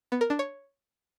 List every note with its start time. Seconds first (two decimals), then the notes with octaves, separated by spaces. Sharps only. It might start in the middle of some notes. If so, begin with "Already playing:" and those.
0.12 B3
0.21 A#4
0.30 D4
0.39 C#5